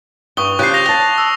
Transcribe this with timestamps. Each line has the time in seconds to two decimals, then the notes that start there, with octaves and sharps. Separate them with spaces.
0.37 G2 C#6 D#6 G7
0.59 C#3 F3 G4 F#6 C7
0.74 A#6 F7
0.89 A5
1.18 E6